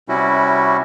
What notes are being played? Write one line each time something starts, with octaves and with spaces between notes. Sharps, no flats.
C3 G3 C#4 E4 F#4